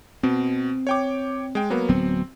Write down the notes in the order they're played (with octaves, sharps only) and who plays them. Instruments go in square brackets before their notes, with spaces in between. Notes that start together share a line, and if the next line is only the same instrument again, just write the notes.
[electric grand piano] B2 [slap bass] C4
[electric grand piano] C#5 G5 D6
G#3 G5
F#3 A#3 B3
[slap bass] D1 F#3 B3 [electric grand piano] C4